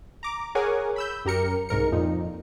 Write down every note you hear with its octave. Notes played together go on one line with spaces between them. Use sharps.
A#5 D6
G#4 A#4 C#5 F#5 G#5 D6
B5 E6 G6
F#2 G4 A#4 C#7
C2 G#2 A#4 C#7
F2 A#2 D#4